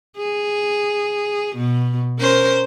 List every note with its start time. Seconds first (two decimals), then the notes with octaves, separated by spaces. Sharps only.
0.17 G#4
1.56 B2
2.19 C#4 A#4 C5